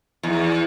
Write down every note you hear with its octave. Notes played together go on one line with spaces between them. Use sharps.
E2